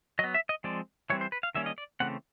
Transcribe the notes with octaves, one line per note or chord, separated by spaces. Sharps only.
F#3 B3 D#5
E5
D#5
F3 G#3 C4 D5
E3 G3 C4 C#5
C5
B4
F5
D#3 G3 A#3 C#4 E5
D#5
D5
C#3 E3 A3 C4 F#5